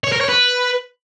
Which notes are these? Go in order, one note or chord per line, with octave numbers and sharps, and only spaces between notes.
C#5
A#4
C#5
B4